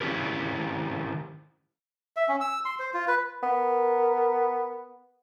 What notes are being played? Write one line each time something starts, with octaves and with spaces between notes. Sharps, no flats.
D#3 C#4 E4 G4 A#4
E5
C#4
E6
C6
C5
F4
B4
B3 A#4